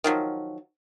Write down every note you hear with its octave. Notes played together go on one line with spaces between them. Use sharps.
D#3 F3 F#3